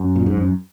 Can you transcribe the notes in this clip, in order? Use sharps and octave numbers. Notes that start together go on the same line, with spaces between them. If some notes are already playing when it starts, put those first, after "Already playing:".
Already playing: F#2
A#2
G#2
F#2